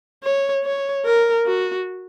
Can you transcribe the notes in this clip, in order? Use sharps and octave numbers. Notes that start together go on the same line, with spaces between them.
C#5
C#5
A#4
F#4